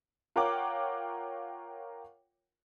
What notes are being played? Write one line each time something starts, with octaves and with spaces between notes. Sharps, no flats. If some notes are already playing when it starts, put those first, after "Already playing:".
F4 A#4 C#5 F#5 G5 D6